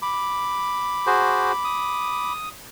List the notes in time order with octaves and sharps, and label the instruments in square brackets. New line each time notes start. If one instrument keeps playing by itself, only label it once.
[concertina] B5 D6
[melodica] F#4 G#4 C5
D#6